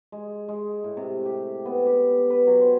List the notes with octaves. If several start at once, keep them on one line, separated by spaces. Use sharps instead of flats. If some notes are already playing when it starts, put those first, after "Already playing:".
G#3
G#3
A2
C3
G4
B3
G4
B4
F#3
C5